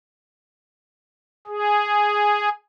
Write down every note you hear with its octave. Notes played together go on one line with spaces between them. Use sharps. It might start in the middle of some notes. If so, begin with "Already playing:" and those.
G#4